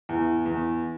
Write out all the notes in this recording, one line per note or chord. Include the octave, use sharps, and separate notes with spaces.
E2
E2